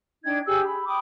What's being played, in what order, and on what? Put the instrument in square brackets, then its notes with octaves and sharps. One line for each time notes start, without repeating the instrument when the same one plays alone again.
[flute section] D4 D#4 G5 G#6
G4 G#4 E6
B5
G5 B5 D6 D#6